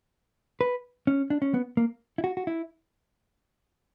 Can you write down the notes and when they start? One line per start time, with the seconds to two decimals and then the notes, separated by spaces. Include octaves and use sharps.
0.61 B4
1.07 C#4
1.30 D4
1.42 C#4
1.54 B3
1.77 A#3
2.18 E4
2.24 F#4
2.37 F#4
2.47 E4